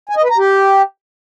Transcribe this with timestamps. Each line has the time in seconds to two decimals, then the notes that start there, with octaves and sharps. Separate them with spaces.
0.09 G#5
0.16 D#5
0.23 B4
0.30 A#5
0.37 G4